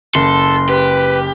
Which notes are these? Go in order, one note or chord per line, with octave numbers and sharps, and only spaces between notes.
F#1 A4 C6
G4 B4